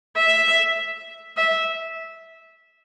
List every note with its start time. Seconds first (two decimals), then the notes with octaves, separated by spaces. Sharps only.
0.17 E5
1.37 E5